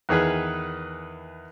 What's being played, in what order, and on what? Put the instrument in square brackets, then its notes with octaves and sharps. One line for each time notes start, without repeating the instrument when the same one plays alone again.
[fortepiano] E2 D#3 G#4 B4